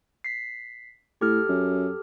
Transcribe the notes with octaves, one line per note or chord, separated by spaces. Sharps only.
B6 C7
A2 G4 A4 F6
F#2